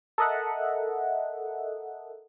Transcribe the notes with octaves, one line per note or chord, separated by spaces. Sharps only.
A4 A#4 D#5 E5 F#5